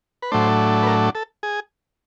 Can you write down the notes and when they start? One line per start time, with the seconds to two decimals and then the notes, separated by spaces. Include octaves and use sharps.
0.22 B4
0.32 A2 F#3 A3 D4 C5
0.83 B4
0.87 A#4
1.15 A4
1.43 G#4